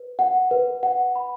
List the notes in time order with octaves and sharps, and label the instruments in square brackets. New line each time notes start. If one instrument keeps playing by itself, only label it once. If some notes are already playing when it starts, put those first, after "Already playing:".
Already playing: [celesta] B4
F#5
B4
F#5
B5